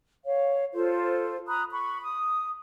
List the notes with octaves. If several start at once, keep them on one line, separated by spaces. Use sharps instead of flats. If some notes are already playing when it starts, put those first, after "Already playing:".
C#5 F5
F4 A4 C5
A#5 B5 D#6 F#6
B5 C#6
D#6